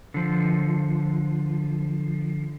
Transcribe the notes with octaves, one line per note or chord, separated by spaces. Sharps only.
D3 F3